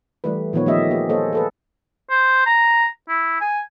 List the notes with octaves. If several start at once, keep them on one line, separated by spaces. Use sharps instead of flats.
E3 G3 A3 G4 B4
A#2 D#3 F3 B3 B4 C#5
F3 A3 B3 G4 D#5 E5
A#3 G4 G#4
A#3 G#4 A4 C5 C#5 D#5
G#4 A4 B4
C5
A#5
E4
G#5